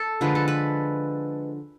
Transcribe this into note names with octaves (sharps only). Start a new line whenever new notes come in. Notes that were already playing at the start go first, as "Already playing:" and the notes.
Already playing: A4
D3 F3 G#3 B4
A4
B4